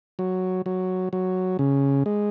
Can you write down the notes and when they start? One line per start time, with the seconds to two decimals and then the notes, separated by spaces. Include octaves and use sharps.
0.19 F#3
0.66 F#3
1.13 F#3
1.59 C#3
2.06 G#3